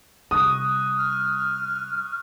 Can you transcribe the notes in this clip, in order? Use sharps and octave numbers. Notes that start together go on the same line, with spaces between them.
C3 G3 C#6 D#6 F#6
F6